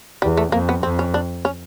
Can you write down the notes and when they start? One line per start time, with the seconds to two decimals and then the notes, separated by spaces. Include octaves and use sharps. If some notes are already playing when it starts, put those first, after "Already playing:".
0.22 E2 G3
0.37 A3
0.52 F2 A#3
0.69 B3
0.83 F2 C4
0.99 C#4
1.14 D4
1.45 C#4